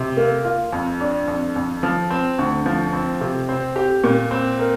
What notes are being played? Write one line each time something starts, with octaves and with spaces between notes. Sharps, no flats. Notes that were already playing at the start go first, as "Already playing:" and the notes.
Already playing: C3
A#3
F4
F2
D4
F2
F2
F3
C4
D2
F3
C4
C3
C4
G4
A#2
C4
A#4